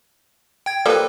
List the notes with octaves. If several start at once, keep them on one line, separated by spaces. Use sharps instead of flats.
G5 G#6
F3 G3 A#3 A4 B4